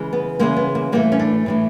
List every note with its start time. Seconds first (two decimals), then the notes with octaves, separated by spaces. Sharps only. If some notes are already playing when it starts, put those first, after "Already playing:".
Already playing: C#3 E3 G#3
0.13 B3
0.39 C#3 E3 G#3 A#3
0.57 B3
0.75 A#3
0.92 A2 E3 A3 A#3
1.12 C#4
1.19 D4
1.46 A2 E3 A3